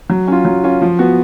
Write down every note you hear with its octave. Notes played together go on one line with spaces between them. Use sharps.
F#3
C#4 F4
F#3
C#4 F4
F3
B3 F#4